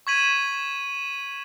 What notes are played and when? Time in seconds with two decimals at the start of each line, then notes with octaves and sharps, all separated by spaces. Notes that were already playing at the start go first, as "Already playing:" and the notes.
0.07 C#6 G#6 B6 D#7 F#7